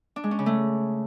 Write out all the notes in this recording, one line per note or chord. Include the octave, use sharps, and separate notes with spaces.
D4
G#3
C#4
C#3
A3